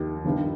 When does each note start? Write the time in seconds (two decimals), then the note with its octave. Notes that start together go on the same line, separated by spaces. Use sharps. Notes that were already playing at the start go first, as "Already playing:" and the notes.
Already playing: D#2 D#3
0.25 G1 G2 D#3